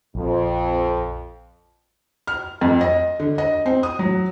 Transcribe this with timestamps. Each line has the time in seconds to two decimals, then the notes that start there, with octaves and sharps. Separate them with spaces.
0.15 A#1 F2
2.27 F6
2.61 F2
2.81 D#5
3.20 D3
3.38 D#5
3.66 C4
3.83 D#6
3.99 F#3